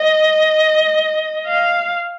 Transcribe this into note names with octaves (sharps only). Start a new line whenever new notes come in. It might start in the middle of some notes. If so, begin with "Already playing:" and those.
Already playing: D#5
F5